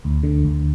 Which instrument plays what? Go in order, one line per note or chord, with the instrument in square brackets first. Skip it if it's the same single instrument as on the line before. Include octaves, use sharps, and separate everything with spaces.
[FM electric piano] D2
D3
D2